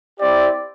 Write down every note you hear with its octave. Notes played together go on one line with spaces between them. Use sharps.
C4 E4 G4 D5